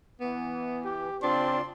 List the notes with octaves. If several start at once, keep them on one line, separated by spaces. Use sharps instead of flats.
E3 B3
G4
C#3 C4 D4 F4 D5 C6